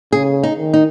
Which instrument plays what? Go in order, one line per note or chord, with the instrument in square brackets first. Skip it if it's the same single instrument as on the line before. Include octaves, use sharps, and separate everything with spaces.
[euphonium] C#3 [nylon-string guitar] G#4
[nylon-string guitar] D#4
[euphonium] D#3
[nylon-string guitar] D#4